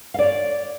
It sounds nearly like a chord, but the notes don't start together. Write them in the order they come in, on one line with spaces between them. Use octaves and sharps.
F5 D5 C#5